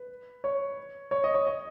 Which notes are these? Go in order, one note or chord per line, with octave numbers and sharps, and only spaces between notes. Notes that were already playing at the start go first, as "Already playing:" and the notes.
Already playing: B4
C#5
C#5
D#5
C#5
D#5